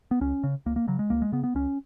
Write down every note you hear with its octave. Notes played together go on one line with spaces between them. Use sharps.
B3
C#2 C#4
C#3
C#2 A#3
A#3
C#3 F#3
G#3
C#2 A#3
G#3
C#3 B3
B3
C#2 C#4